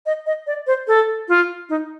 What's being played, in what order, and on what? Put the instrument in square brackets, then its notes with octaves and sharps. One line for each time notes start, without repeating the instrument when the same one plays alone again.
[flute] D#5
D#5
D5
C5
A4
F4
D#4